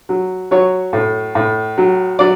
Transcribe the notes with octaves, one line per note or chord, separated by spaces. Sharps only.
F#3
F#3 C#5
A2
A2
F#3
F#3 D5